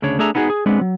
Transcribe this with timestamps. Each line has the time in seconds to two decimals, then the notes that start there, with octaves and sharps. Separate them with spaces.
0.02 D2 C#3 D4 C#5
0.19 A3 D4 G#4 E5 A#5
0.35 B3 D#4 F#4 G#4
0.50 G#4
0.66 G#3 B3 C4 D4
0.81 F#3